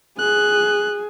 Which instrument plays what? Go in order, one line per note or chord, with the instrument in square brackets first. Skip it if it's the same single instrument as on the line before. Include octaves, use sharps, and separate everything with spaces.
[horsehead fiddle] G#4 [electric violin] F#6